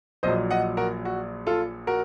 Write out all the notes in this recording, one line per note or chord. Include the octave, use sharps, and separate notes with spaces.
A#1 A#2 F#3 C5 D#5
D#5 F#5
F#4 A#4
F#4
F4 A4
F#4 A#4